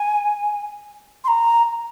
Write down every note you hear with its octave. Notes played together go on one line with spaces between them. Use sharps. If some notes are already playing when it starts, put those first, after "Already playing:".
Already playing: G#5
C6
A#5